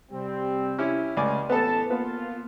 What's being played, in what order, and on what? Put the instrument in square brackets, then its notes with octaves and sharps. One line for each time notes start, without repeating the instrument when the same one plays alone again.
[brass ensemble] C3 G3 C4
[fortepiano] C#4 E4 G4
[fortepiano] C#2 D5 G#5 [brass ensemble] A3 F4
[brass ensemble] A1 A5 [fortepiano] B3 A4
[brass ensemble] A#3 F4 [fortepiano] B3